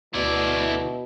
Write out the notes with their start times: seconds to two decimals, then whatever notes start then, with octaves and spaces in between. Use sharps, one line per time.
0.14 D2 B2 E4 D5